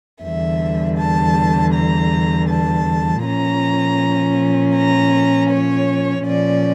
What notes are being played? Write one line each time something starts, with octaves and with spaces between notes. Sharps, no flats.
E2 D3 G3 E5
A5
A#5
A5
A#2 F3 C#4 A#5
A#5
C#5
A#2 F3 C#4 D5